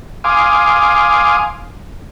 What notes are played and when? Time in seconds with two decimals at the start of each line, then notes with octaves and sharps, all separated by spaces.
0.24 F5 G#5 C6 D6 D#6